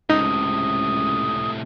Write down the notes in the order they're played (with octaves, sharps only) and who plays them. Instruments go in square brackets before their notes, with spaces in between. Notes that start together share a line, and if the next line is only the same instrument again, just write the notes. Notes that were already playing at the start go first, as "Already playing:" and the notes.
[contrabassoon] C#2 [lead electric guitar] A2 C3 [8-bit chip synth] D#4 [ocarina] D#6